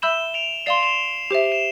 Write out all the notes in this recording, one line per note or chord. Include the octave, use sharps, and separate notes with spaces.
E5 B5 E6 G6 E7 G7
D7 F7
D5 F5 C6 C7 E7
E7 G7
G4 C5 E5
E7